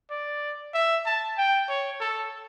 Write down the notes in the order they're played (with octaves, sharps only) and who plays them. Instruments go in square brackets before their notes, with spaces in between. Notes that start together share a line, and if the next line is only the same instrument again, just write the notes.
[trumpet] D5
E5
A5
G5
C#5
A4